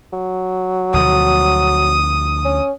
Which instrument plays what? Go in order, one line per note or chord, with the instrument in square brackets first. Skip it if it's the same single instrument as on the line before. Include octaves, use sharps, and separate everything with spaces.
[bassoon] F#3
[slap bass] D2 B2 F3 [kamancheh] D#6
[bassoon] C#4